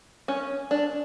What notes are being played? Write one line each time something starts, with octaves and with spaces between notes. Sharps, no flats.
C#4
D4